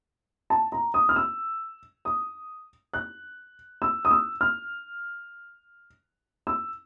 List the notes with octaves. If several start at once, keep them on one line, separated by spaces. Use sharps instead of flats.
A5
A#5
D#6
F6
E6
D#6
F#6
E6
D#6
E6
F6
E6